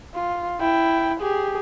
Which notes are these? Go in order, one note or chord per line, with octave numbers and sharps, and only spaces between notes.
F4
E4 G5
G4 G#4